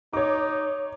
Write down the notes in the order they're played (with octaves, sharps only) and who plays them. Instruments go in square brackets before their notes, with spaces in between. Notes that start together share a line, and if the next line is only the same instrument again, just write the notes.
[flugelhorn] D#4 [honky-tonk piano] C#5 D6